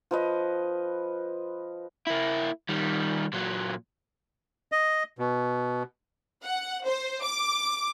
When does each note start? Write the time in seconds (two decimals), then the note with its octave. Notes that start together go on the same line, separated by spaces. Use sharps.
0.11 F3 B4 D#5
2.07 A#3 E4
2.69 D#3 G3
3.33 A#2 F#3
4.72 D#5
5.19 B2
6.44 F#5
6.86 C5
7.23 D6